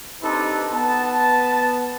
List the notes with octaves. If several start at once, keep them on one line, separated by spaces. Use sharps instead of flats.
C4 D4 D#4 G4 A4 B4
B3 A5